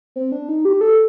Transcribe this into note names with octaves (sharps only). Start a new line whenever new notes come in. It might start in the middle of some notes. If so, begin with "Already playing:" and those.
C4
D4
D#4
G4
A4